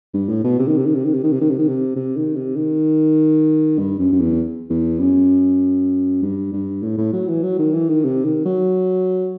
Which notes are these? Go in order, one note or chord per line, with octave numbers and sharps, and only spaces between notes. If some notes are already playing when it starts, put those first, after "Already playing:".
G2
A2
B2
C3
D#3
C3
D#3
C3
D#3
C3
D#3
C3
D#3
C3
D#3
C3
C3
D#3
C3
D#3
G2
F#2
F#2
E2
E2
F#2
G2
G2
A2
A2
F#3
E3
F#3
D#3
E3
D#3
C3
D#3
F#3